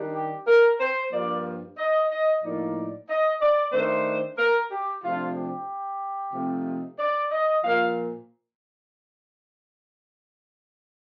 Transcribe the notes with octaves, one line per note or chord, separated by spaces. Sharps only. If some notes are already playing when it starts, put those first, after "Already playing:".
Already playing: D#3 G3 D4
G4
A#4
C5
G2 F3 A#3 D5
D#5
D#5
A2 F3 A#3 D#4 D5
D#5
D5
D#3 A3 D4 C5
A#4
G4
C3 F3 A3 D4 F4
G4
C3 F3 A3 C4 D#4
D5
D#5
A#2 F3 A#3 F5